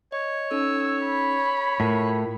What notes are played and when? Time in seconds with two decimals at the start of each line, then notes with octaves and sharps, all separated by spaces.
0.12 C#5 D#5
0.51 C#4 D#4 A4 E6
1.06 B5
1.80 A2 E4 F4 A#4